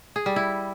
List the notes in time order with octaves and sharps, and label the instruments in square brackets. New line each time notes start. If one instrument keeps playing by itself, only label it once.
[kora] G#4
G3
E4